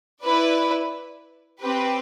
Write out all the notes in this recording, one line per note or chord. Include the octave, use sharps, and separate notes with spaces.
E4 B4 D5
C4 G4 B4